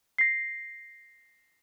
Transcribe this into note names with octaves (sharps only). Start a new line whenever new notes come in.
A#6 C7